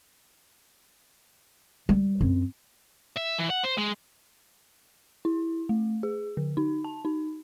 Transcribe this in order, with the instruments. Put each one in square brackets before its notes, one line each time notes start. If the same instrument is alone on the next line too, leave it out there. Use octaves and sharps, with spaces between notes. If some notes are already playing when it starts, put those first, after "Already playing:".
[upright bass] G3
F#2 C4
[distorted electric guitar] E5
E3
F#5
C5
G#3
[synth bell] E4
A3
G#4
D3
D#4
A5
D#4